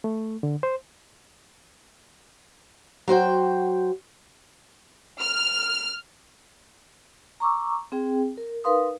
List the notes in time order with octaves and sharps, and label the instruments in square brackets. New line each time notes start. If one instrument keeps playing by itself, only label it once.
[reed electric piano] A3
D3
C5
[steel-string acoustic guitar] F#3 F#4 C5 G5
[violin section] F6
[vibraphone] A#5 C#6 D6 E6
C4 G#4 G5
A#4
D#4 A#4 B4 F5 C6 D#6